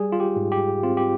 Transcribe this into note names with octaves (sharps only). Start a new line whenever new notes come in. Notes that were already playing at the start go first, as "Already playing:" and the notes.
Already playing: G3 G#4
F4
G4
G#2
G4
C4 F4
G4